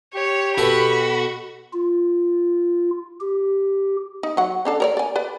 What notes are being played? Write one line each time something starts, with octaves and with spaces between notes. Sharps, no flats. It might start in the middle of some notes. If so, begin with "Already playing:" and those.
G4 C#5
B2 F#4 A4 B5
F4
G4
D#4
F#3 F#5
C#4 D4 A4
A#4 C#5 D5
D5 G#5
B4 D5